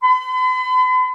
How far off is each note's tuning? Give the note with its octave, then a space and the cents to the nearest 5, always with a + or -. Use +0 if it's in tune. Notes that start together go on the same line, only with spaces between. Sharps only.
B5 +45